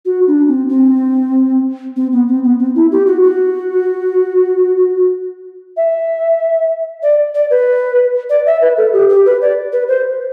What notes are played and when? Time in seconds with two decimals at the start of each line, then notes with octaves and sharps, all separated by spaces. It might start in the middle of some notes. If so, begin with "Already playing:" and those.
0.05 F#4
0.27 D4
0.48 C4
0.69 C4
1.96 C4
2.12 B3
2.28 C4
2.44 B3
2.59 C4
2.75 E4
2.92 G4
3.06 F#4
3.22 F#4
5.77 E5
7.03 D5
7.35 D5
7.50 B4
8.30 D5
8.46 E5
8.61 B4
8.77 A4
8.93 G4
9.09 G4
9.26 B4
9.42 D5
9.72 B4
9.88 C5